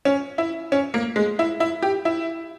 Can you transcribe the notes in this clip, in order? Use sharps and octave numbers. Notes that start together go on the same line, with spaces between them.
C#4
E4
C#4
A#3
G#3
E4
E4
G4
E4